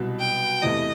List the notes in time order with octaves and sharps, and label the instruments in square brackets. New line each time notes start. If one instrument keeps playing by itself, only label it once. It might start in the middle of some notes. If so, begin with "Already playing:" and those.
Already playing: [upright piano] C2 B2 F#3
[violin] G5
[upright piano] E2 C3 E3 A3 [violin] D#5